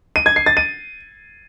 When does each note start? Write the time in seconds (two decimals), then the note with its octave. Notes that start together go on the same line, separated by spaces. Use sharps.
0.16 D#7
0.26 G#6
0.36 C7
0.46 A6
0.57 D#7